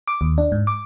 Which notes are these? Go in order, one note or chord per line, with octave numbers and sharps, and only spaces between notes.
D6
D#2
D4
G#2
D6